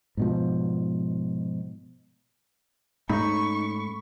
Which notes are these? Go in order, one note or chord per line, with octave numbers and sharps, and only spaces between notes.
G#2 B2 F3
G#2 A3 C#4 D#4 B5 C#6